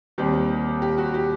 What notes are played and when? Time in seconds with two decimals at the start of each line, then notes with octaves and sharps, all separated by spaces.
0.18 D#2 D#3 G3 C4 G4
0.82 G4
0.98 F#4
1.14 G4